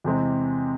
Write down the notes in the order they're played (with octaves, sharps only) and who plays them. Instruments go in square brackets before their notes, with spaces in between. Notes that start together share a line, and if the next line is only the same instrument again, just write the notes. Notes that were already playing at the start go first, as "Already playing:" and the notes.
[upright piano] E2 C3 E3 G#3 C4